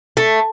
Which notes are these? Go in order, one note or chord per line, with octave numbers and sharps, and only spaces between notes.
A3